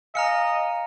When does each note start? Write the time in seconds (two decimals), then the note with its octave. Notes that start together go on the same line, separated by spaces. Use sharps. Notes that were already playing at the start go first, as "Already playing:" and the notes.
0.15 D#5 F5 G#5 A#5 F6 C#7